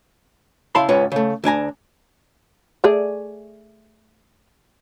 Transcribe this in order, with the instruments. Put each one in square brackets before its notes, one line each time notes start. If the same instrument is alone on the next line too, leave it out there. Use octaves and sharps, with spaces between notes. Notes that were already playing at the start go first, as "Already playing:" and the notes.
[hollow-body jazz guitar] C#3 E4 F5 A5 B5 C6
C#2 G#2 C#4 F4 B4
C#3 A3
D2 D4 G#5 A#5
[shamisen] A3 G#4 D5